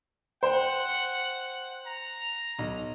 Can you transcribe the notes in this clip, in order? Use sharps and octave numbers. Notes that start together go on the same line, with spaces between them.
C5 F#5 G5
A#5
B1